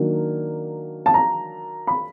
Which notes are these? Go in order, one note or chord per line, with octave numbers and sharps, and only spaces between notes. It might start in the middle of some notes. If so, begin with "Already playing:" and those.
Already playing: D#3 F#3 A#3 D4
A5
A#5
B5